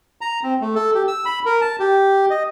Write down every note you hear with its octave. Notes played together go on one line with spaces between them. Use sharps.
A#5
C4
A3
A4
G4
E6
B5
A#4
A5
G4
D#5